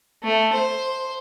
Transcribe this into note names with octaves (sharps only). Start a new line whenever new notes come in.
A3
C5